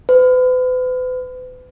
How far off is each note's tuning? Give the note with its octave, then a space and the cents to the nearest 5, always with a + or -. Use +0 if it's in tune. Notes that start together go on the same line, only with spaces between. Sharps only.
B4 +40